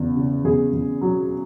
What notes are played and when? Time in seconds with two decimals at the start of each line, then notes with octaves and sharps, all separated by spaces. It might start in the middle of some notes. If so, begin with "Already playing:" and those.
Already playing: E2 C#3
0.16 C#3
0.44 E2 G#4
0.73 E2
1.01 F#3